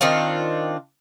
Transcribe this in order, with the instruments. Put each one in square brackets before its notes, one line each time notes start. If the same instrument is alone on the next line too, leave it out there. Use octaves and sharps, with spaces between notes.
[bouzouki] D#3 C4 D4 F4